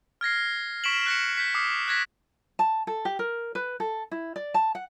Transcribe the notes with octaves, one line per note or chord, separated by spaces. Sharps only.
F6 G#6 A#6 C7
C#6 B6 D7 E7 F#7
F#6 A#6 C#7
G6 B6
D6 D#6 F6 C7
F#6 G#6 A#6 B6
A5
A4
G4
A#4
B4
A4
E4
D5
A5
F#5